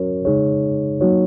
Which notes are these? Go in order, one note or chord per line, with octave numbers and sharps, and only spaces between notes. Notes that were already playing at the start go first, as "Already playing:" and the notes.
Already playing: F#3 C#4 F#4 A#4 C#5
C#3 G#3 D#4 G#4 C#5
F#3 A#3 D#4 F#4 C#5